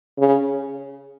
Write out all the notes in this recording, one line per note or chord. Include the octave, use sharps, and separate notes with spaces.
C#3